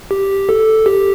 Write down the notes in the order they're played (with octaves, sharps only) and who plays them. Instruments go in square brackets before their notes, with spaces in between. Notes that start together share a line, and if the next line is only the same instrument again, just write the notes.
[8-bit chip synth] G4
A4
G4